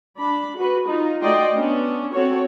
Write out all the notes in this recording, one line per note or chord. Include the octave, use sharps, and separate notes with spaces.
D4 B5
F#4 B4
D#4 F4
A3 F#4 D5 D#5 G5 C6
B3 C#4 D4
C4 F#4 A4 C#5